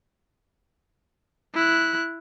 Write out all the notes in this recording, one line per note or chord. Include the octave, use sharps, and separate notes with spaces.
E4 F#6